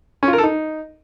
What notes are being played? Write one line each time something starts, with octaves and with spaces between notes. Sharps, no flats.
C#4
F4
A#4
A4
D#4